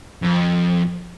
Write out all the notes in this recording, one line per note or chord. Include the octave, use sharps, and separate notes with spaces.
F2